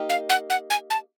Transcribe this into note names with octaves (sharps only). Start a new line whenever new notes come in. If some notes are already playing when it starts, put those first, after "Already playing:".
Already playing: A#3 D#4 G4
F5
F#5
F#5
G#5
A5